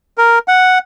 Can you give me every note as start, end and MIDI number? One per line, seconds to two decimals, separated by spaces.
0.18 0.39 70
0.48 0.78 78